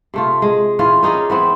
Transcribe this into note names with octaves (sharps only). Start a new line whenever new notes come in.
C3 A3 F4
G#3
E3 C#4 F4
C#4 D#4 G#4 D5
E3 B3 C4 B4